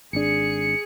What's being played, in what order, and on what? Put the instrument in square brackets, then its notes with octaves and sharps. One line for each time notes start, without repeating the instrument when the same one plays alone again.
[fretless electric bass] G#1 D4 [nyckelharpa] G#4 [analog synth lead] C#7